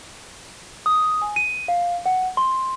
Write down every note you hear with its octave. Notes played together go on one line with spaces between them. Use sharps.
D#6
G#5
D#7
F5
F#5
C6